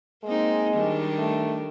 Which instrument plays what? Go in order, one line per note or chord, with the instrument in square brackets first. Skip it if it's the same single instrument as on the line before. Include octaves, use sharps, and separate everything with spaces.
[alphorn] G#3 [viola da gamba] A#3 C4 D#4
[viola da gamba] D#3 G3 D4
[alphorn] A3